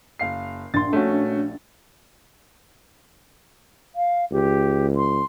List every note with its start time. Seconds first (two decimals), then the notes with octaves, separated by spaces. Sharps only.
0.19 F#1 F5 C7
0.74 A#1 C6 A6
0.93 A3 C#4 F#4
3.95 F5
4.32 C#2 G4
4.96 C6